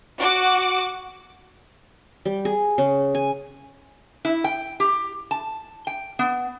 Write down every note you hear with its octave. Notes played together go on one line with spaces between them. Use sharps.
F#4 D6
G3
G#4
C#3
G#5
E4
G5
G4
A5
G5
B3